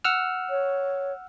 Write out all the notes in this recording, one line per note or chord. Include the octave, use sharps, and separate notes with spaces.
F#5 E6 F6
C#5